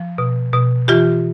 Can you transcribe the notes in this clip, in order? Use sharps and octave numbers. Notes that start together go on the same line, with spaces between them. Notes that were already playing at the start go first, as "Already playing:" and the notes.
Already playing: F3
B2
B2
E3 F4 G4